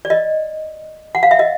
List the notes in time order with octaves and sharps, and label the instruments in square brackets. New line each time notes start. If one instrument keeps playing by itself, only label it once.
[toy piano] D5
D#5
F#5
F5
E5
D#5